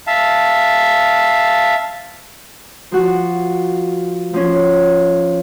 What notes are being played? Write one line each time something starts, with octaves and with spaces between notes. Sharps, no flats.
E5 F5 A5
F3 F#4
F3 C#4